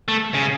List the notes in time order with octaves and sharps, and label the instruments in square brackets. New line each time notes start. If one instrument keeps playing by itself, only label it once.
[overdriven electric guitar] A3
C#3